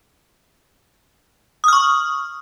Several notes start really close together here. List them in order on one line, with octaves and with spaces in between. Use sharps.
D#6 F6 C#6